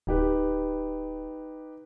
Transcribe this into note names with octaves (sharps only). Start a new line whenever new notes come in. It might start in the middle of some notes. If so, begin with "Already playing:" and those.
D1 D#4 G4 B4